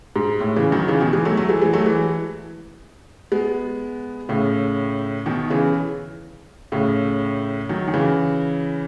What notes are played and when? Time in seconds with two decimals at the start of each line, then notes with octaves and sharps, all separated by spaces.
0.16 G#2
0.40 A2
0.56 C#3 E3
0.72 D#3 F#3
0.88 C#3 E3
1.01 B2 D#3
1.13 E3 G#3
1.25 F#3 A3
1.37 F#3 A3
1.49 E3 G#3
1.61 E3 G#3
1.73 F#3 A3
1.86 E3 G#3
3.32 G#3 B3
4.29 A2 C#3
5.26 B2 D#3
5.50 C#3 E3
6.72 A2 C#3
7.69 D#3 F#3
7.88 D#3
7.94 C#3 E3